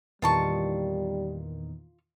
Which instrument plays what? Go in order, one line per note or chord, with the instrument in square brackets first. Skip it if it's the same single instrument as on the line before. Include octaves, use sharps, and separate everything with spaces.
[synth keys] E2 A#2 D#3 [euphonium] G3 [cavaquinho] F4 A5 C#6